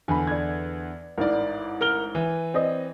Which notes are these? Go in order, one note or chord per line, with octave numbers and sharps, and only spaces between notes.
E2 D3 G#5 B5
D5 G#6
A1 G#2 A#4 D5
A#4 F6 G7
E3
C4 D5 D#5